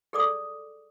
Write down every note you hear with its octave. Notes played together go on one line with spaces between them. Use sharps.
G#4 A4 D5 D6 D#6